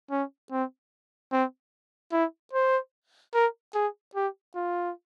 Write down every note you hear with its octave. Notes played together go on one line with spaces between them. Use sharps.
C#4
C4
C4
E4
C5
A#4
G#4
G4
F4